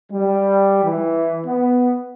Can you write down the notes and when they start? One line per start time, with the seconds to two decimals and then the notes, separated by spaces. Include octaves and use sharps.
0.10 G3
0.83 E3
1.45 B3